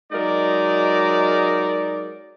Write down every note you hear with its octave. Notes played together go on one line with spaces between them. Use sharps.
F#3 G#3 D#4 A#4 D5